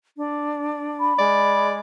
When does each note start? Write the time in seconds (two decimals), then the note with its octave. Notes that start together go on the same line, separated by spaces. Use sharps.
0.17 D4
1.00 B5
1.19 G#3 D5